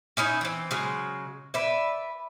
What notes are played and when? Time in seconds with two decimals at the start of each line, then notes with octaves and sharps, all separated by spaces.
0.17 C#4 D#4 E4 C#5
0.41 E3 C4
0.71 C#3 F#3 G#3
1.54 B4 D5 E5